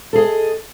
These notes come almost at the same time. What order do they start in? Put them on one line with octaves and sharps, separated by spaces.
A4 G#4 D#5